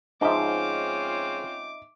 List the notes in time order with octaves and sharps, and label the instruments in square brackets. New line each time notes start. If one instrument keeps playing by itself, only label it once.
[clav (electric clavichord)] G#2 F3 [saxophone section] C4 C#4 F4 [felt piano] D#4 E5 [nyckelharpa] D6